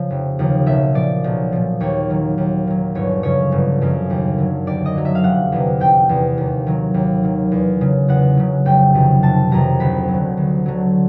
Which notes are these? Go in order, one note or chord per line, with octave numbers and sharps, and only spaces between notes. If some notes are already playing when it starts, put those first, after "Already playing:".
Already playing: C#3 F3
F1
D#2 C#3 F3
B1 E5
A#2 F3 D5
B1
A#2 F3
D#2 C#5
D#3 F#3
D#2
D#3 F#3
G1 C#5
F#2 C#3 F3 C#5
G1
F#2 C#3 F3
D#2
D3 F#3
D#2 D5
D#5
D3 F#3
E5
F5
F1 F#5
E2 C3
F1 G5
E2 C3
D#2
D#3 F#3
D#2
D#3 F#3
E2
C#3 F#3
E2 F#5
C#3 F#3
F1 G5
F2 C3 D#3 F#3
F1 A5
F2 C3 D#3 F#3 A#5
D2 B5
F#3
D3
D2
D3 F#3